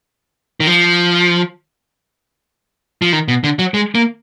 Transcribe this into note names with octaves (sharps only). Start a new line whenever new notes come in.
D#3
F3
F3
D#3
B2
D3
F#3
G#3
A#3